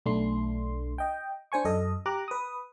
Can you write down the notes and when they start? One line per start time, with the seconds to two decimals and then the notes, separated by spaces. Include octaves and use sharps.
0.06 B1 A3 D4 C6
0.98 D#5 G5
1.52 D4 C5 G#5 C#6
1.65 F#2 A4 D#5
2.06 G4 A#5 D6 F#6
2.28 B4 D#6